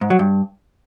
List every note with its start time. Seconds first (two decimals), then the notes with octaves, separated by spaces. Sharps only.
0.01 G#2
0.10 F#3
0.19 G2